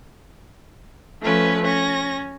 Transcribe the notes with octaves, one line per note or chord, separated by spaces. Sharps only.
F3 A3 C#4 B4
C#4 A#6